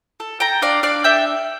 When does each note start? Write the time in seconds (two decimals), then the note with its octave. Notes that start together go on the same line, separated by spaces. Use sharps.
0.20 A4
0.40 A4 G5 A#5
0.62 D4 D5 F5
0.83 D4 D5 F5
1.04 A4 E5 G5